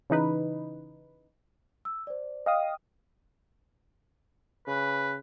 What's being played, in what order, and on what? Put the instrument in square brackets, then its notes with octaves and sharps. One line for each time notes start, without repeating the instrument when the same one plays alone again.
[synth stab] C#3 E3 D#4 B4
[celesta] E6
C5 D5
[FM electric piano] D#5 F5 D#6 [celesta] G5
[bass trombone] C#3 [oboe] B4